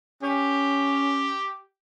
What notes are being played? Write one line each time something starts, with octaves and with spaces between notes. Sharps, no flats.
C#4 G4